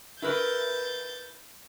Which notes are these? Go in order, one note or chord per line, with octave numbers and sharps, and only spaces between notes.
E4 A#4 B4 G6 A6